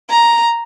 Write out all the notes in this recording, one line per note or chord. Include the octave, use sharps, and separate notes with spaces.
A#5